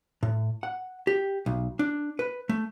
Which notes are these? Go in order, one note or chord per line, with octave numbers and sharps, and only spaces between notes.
A2
F#5
G4
B1
D4
B4
A3